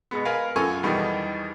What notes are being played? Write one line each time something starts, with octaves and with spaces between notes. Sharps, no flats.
B2 G#3 B3
A#4 B4 F5 G#5
F#2 F4 A4 G#5 C#6
E2 B2 D#3 G3